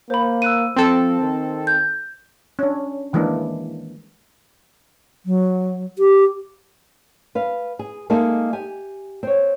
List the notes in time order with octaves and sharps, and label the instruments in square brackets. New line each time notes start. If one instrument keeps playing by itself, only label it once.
[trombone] A#3 [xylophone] C5 B5
[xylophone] E6 F#6 D#7
[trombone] F3 [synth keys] C4 A4
[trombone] D#3
[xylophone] G6
[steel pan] C#4 D4
D#3 E3 G#3 A#3 D4
[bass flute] F#3
G4
[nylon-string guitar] B4 F5
G#4
G#3 A#3 D#4 G#4 A4 E5
G4 G#5
C4 C#5